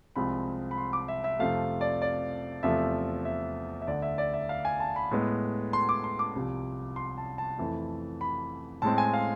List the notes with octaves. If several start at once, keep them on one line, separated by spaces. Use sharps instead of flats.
C2 C3 F3 G#3 C4 B5
B5
C6
D6
E5
E5
F2 C3 F3 A3 F5
D5
D5
E2 C3 F3 A3 E5
E5
E5
D2 D3 A3 D5
E5
D5
E5
F5
G#5
A5
B5
A2 G#3 B3
C6
D6
C6
D6
C2 C3 F3
C6
A5
A5
F2 E3 A3
B5
A2 G#3 C4 A5
G#5
F5